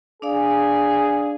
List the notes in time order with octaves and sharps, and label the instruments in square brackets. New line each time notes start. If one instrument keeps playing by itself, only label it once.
[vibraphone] D4 D5 F5 [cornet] G#4